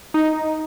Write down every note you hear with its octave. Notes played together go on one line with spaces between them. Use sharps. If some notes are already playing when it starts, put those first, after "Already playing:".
D#4